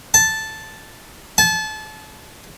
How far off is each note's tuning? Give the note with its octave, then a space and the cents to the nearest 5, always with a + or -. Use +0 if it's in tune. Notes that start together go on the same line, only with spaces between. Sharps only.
A5 -5
A5 -30